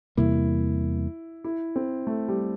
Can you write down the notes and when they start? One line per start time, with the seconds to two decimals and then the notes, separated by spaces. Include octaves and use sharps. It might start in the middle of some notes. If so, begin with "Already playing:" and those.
0.17 E2 C3 G3 A#3 E4
1.44 E4
1.76 C4
2.07 A3
2.28 G3